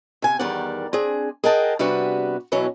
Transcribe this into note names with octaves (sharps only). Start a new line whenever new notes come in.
C3 G#5
E2 D#3 G3 A#4 D5 F#5
C4 D4 G#4
G#4 A#4 D#5 F#5 G5 A5
C3 G3 B3 D4 F#4 B4
B2 E3 F#3 C#4